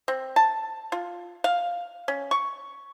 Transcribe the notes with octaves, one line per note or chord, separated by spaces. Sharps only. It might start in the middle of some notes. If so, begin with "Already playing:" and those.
C4
A5
F4
F5
C#4
C#6